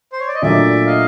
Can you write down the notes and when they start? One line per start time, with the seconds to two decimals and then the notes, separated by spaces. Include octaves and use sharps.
0.13 C5
0.20 C#5
0.28 D5
0.35 D#5
0.42 A#2 F#3 A3 D4 D5 E5
0.87 D#5 F5